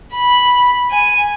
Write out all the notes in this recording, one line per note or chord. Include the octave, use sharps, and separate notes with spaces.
B5
G#5